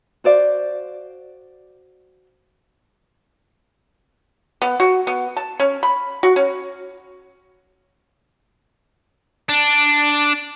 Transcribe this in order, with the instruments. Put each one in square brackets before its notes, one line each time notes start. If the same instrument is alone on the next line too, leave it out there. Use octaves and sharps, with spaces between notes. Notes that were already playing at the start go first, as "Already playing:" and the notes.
[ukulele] F#4 C5 D5 F5
[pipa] B3
F#4
B3
A5
C#4
B5
F#4
C#4
[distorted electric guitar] D4